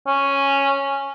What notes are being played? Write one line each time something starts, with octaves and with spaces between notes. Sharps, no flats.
C#4